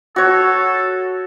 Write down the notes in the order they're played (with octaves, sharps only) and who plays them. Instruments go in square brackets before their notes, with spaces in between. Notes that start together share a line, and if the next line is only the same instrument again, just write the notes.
[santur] F#4 C#5 [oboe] A4